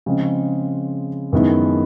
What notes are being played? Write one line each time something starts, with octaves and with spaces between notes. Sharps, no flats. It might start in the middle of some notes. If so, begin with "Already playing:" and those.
C#3 F3 G#3 C4
F#2 D#3 G#3 B3 E4